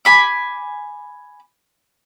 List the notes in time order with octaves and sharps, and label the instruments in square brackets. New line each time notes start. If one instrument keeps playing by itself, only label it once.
[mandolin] G#5 B5 D6